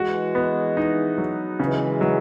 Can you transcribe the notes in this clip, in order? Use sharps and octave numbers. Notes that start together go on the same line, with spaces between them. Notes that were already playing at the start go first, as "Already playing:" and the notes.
Already playing: E3 G#3 F#4
B3
D#4
F#3
C#3 E3 G#3
F#3